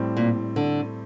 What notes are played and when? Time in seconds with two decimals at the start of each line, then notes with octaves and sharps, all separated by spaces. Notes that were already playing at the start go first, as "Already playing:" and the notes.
Already playing: A2 G3 C4
0.17 A#2
0.56 D3